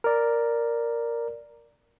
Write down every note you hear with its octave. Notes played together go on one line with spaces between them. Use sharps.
A#4 D5